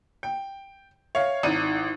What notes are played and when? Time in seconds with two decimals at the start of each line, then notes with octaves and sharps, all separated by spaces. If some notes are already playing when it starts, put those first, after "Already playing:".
0.23 G5
1.15 C#5 E5 F5
1.43 G#1 D#4 E4 D5 D#7